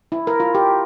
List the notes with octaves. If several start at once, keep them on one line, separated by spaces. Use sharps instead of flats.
E4
A#4
F4
G4